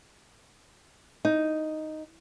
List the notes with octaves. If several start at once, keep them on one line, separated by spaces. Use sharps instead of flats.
D#4